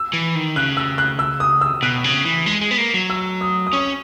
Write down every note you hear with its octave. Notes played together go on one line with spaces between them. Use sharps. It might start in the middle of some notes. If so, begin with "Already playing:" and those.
Already playing: E6
E3
D#3
C#3 F#6
E6
F#6
E6
D#6
E6
B2 F#6
C#3
E3
G#3
G#3
B3
A#3
F#3
E6
D#6
D#6
C#4 C#6